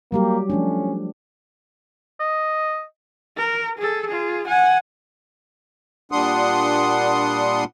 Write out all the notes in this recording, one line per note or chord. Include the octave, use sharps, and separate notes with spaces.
F#3 G3 A#3 G4
F3 A3 C#4 D4
D#5
A#4
G#4 A4
F4 G#4
F#5 G#5
A#2 G3 D4 F#5 C6 D#6